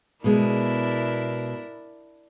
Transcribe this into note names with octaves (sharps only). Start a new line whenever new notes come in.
B2 G#3 D4 E4 A#4